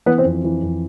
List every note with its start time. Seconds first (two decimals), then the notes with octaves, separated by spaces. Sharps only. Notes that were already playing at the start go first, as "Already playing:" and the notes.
0.06 E3 B3 B4
0.18 C4 C5
0.25 F2
0.44 E3
0.63 F2